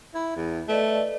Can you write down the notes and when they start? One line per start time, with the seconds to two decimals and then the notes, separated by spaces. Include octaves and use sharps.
0.15 E4
0.36 E2
0.68 A3 B4 D5 D#5